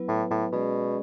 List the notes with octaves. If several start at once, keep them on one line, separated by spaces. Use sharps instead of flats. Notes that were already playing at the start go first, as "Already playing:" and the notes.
Already playing: F#3 B3 E4 B4
A2
A2
B2 G#3 C#4 G#4 D5